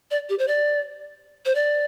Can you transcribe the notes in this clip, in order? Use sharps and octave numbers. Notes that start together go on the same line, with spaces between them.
D5
G4
C5
D5
C5
D5